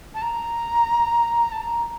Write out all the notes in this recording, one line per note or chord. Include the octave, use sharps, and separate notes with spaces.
A5
A#5
A5
A#5